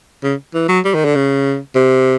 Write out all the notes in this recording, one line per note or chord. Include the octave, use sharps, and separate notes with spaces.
C#3
E3
F#3
G3
D#3
D3
C#3
C3